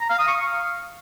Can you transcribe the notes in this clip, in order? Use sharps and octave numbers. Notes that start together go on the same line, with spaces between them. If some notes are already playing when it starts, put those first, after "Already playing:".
A#5
F5
D#6
C#6
F5